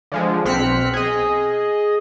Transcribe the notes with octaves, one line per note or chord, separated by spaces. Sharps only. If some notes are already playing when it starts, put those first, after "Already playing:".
D3 F3 G#3
B1 C4 F6 F#6 B6 C#7
G#4 D#5